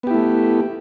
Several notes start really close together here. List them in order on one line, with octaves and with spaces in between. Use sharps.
B3 G4 E4 A3